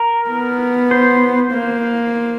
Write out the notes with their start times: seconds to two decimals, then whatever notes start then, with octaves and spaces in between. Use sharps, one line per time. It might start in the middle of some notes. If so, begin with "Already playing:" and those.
Already playing: A#4
0.29 B3
0.91 C5
1.52 A#3